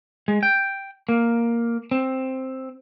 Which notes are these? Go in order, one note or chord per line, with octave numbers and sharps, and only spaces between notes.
G#3
G5
A#3
C4